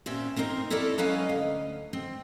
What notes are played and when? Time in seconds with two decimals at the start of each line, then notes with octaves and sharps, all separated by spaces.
0.06 A#2 C4 C#4 E5
0.36 B3 C4 D#4 A#4 C5
0.70 E4 A4 A#4 C#5 D5 E5
0.98 F#3 C#4 B4 D#5 F5 G#5
1.29 D2
1.93 C4